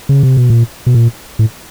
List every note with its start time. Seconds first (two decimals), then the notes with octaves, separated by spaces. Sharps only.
0.09 C#3
0.23 C3
0.37 B2
0.50 A#2
0.86 B2
0.94 A#2
1.39 A2